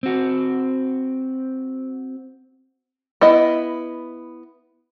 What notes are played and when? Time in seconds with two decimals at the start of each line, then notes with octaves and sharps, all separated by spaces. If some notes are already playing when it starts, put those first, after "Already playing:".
0.03 C4 F#4
3.21 B3 E4 D#5